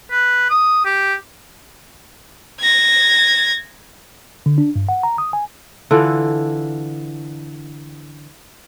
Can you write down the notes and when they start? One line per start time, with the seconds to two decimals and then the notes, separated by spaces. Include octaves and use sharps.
0.12 B4
0.50 D#6
0.85 G4
2.60 G#6 A#6
4.46 D3
4.58 D4
4.76 G2
4.89 F#5
5.03 A#5
5.18 D#6
5.33 G#5
5.91 D3 E3 F4 A4